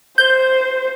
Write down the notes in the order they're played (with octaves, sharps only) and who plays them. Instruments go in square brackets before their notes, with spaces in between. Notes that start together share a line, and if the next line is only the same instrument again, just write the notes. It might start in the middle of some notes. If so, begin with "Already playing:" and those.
[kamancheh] C5 [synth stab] G6